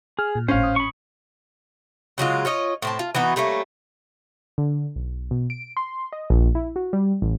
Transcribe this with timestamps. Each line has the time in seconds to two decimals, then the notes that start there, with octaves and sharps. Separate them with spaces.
0.19 G#4 F6
0.35 A#2
0.48 G#1 A2 C#4 C5 F5
0.63 D#6
0.76 B5 C#6
2.18 C#3 F#3 G#3 F4
2.45 F4 C#5 D#5
2.82 A2 C4 A5
2.99 F4
3.15 E3 B3 D#4 F#4
3.36 G3 A3 A#3 C#4
4.58 D3
4.96 B1
5.31 B2
5.50 D7
5.77 C6
6.13 D#5
6.30 A#1
6.55 E4
6.76 F#4
6.93 G3
7.22 A1